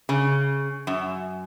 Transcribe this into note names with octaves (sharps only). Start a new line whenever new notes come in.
C#3
F#2